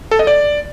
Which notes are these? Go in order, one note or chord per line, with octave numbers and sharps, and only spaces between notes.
A4
D#5
D5